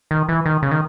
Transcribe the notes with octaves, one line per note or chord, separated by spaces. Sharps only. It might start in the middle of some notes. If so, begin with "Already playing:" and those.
D#3
E3
D#3
C#3
D#3